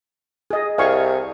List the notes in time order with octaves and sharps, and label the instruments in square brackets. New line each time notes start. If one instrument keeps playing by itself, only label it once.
[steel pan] G#4 D#5
[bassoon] C2 [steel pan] F5 G#5 C#6